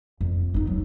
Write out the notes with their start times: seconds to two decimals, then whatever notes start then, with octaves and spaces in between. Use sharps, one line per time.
0.21 F2
0.54 B3 D#4
0.67 F#3